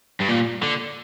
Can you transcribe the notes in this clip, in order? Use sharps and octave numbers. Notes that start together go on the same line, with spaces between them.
G2
A#2
D3